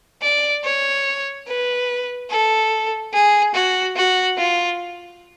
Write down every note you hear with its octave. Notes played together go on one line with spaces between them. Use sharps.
D5
C#5
B4
A4
G#4
F#4
F#4
F4